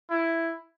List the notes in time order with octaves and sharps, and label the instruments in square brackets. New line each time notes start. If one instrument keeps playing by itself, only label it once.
[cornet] E4